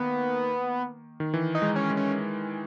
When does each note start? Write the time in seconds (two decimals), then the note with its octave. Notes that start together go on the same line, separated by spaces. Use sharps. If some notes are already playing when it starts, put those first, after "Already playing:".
Already playing: D#3 A#3 B3
1.20 D#3
1.34 E3
1.55 D#4
1.62 G#3
1.76 C#4
1.90 G#3
1.97 C#4